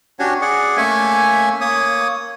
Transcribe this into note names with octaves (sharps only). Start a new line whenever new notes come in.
C#4 D4 F#4 G4 C#5
G#4 D5 F#5
A3 A#3 C#4 C#5 E5 G#5
A#3 C#5 D#6